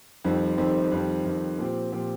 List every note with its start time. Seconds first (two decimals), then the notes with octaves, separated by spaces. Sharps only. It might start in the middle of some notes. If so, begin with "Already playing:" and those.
0.24 F2 D#3 G3 C4
0.57 F2 D#3 G3 C4
0.92 F2 D#3 G3 C4
1.24 F2 D#3 G3 C4
1.58 A#2 F3 C4 G4
1.92 A#2 F3 C4 G4